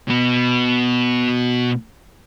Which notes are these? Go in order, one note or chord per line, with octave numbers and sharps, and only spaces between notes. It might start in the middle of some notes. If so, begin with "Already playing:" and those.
B2 B3